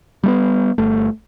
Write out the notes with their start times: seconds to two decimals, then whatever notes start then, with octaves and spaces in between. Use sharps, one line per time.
0.23 G3 A3 B3
0.78 G1 A3